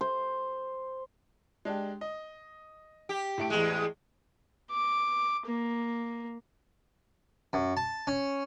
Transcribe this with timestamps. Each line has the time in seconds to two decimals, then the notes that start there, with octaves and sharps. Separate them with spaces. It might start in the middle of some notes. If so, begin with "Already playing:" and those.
0.01 C5
1.65 G#3 D4 G4
2.01 D#5
3.09 G4
3.38 A2 A3 D7
3.50 E2 G#3
4.71 D6
5.47 A#3
7.53 F#2
7.77 A5
8.07 C#4